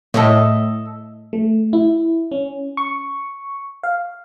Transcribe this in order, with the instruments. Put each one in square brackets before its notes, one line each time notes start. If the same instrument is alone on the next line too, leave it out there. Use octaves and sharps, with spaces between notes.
[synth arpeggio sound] A2 [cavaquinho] A4 D#5 E5
[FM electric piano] A3
E4
C#4
C#6
F5